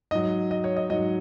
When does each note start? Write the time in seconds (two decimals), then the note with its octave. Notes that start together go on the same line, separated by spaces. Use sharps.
0.11 G#2 F#3 D#5
0.51 D#5
0.64 C#5
0.76 D#5
0.90 G#2 F#3 D#5